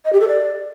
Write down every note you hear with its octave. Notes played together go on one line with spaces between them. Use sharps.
D#5
G4
A4
D5